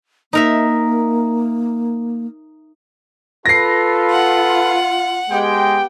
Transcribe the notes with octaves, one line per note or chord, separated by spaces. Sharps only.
A#3 D#4 A#4 E5
F4 A4 B4 A#6 C7
F#5
G#3 B3 G4 G5